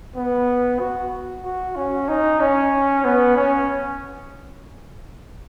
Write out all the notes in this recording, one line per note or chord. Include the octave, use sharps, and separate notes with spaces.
B3
F#4
F#4
C#4
D#4
C#4
B3
C#4